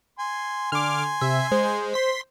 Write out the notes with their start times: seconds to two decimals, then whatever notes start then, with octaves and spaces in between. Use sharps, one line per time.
0.19 G#5 C6
0.72 D3 G#5 C6 D6 F6
1.21 C3 E5
1.51 G#3 C5
1.94 C6 B6